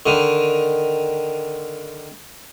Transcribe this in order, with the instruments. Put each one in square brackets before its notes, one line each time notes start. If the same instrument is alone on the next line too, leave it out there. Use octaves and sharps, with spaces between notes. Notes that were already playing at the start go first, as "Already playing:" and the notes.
[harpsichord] D3 D#3